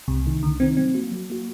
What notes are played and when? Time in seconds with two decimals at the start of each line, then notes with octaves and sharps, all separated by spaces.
0.08 C2 C3
0.26 C3 D#3 A3 D#4
0.43 C2 D3
0.60 C3 D#3 A3 C4 D#4
0.77 F#3 C4
0.95 A#3 F#4
1.12 F#3
1.30 A#3 F#4